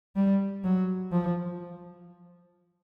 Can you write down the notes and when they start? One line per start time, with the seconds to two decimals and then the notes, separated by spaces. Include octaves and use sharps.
0.16 G3
0.64 F#3
1.12 F3